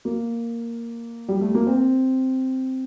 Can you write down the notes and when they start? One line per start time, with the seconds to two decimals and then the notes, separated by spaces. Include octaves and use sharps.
0.05 A#3
1.28 G3
1.41 A3
1.55 A#3
1.67 C4